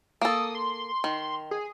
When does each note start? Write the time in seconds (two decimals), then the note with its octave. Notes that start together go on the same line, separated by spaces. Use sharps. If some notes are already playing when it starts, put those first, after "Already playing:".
0.21 A#3 A4 D#6
0.55 C6
1.04 D#3
1.51 G#4